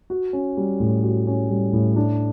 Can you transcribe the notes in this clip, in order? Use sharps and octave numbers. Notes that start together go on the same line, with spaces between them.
F#4
C#4
G3
A2
F#4
C#4
G3
A2
D4